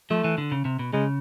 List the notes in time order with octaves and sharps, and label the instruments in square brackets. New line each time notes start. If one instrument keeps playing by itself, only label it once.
[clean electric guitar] F3 [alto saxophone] A3
[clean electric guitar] E3
D3
C#3
C3
B2
[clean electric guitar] C#3 [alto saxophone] G#3